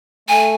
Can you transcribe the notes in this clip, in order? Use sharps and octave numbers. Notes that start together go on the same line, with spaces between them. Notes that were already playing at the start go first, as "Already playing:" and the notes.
A3 G#5